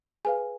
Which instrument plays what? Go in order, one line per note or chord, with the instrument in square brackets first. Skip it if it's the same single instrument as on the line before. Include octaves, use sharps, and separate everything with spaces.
[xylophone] G#4 B4 F5 G#5